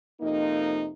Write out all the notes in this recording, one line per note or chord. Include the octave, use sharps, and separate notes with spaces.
F2 C3 A#3 D#4